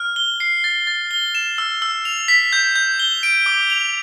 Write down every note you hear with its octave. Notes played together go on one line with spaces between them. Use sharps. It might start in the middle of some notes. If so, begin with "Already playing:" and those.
Already playing: F6
G7
C7
A6
A6
G7
E7
E6
E6
F7
B6
G6
G6
G7
D7
D6
F7